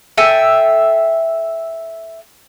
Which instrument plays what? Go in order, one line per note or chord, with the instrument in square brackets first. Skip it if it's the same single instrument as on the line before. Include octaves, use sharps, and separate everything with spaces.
[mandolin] A4 E5 G5 G#5